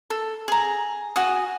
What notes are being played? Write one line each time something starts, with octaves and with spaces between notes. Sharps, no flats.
A4
G#4 A#5
F#4 G#5 D#6